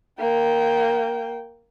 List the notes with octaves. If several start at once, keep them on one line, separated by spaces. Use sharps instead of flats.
A#3 G5